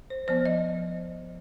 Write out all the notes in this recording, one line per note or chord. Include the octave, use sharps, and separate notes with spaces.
C5
F3 B3 C5
D#5